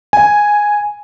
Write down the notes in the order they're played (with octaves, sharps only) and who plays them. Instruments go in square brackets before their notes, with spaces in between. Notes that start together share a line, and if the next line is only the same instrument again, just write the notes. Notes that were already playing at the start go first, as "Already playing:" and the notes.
[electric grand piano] G#5